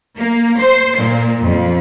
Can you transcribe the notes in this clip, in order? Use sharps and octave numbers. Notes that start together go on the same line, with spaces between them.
A#3
C5
A#2
F2